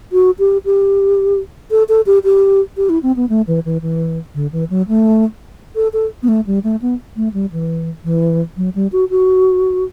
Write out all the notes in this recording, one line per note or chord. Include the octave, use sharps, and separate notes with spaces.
F#4
G4
G4
A4
A4
G4
G4
G4
E4
C4
B3
A3
E3
E3
E3
D3
E3
F#3
A3
A4
A4
B3
A3
G3
A3
B3
A3
G3
E3
E3
F#3
G3
F#4
F#4